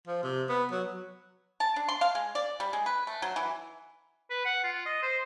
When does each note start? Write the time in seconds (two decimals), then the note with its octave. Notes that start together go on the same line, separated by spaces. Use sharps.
0.07 F3
0.23 C3
0.49 B3
0.72 F#3
1.60 A5
1.76 D4
1.88 C6
2.01 F5
2.15 G#3
2.35 D5
2.60 G3
2.73 G#3
2.86 B4
3.07 A3
3.22 F#3
3.36 E3
4.30 B4
4.45 F#5
4.64 F4
4.85 D#5
5.02 C5